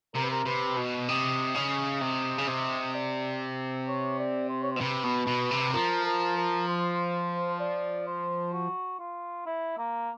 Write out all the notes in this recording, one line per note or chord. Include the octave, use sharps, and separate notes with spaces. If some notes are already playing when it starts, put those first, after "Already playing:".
C3 A#4
B4
A#4
C3 B4
B2
C3 D#5
C#3 D#5
C3
C#3
C3
D5
C#5
D5
C5
C#5
C5
B2
C3 B4
B2
B2
C3
F3 A#4
A#4
A#4
C5
D5
C5
F#4
F4
E4
A#3